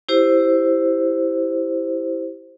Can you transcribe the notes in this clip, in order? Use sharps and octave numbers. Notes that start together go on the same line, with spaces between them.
E4 G4 C5